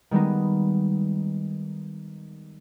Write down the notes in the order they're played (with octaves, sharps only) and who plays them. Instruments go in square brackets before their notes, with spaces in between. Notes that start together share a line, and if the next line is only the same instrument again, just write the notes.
[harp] D#3 G3 G#3 B3 D#4